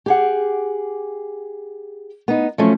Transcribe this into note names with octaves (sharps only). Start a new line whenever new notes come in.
G4 G#4 F#5
B3 D#4
F3 F#3 A3 C#4